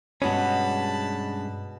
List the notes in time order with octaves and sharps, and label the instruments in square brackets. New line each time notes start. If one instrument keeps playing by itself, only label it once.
[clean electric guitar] G2 G#3 C#4 [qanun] B2 G#4 [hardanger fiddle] A5 B5